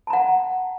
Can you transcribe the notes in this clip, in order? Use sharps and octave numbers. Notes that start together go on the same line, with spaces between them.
F#5 A5 A#5